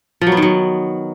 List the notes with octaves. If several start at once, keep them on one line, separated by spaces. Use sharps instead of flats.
F3
F#3
B3
D#3
F#3